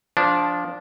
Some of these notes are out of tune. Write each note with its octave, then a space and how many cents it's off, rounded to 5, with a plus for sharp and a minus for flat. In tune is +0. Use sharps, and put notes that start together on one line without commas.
F3 +10 D4 -15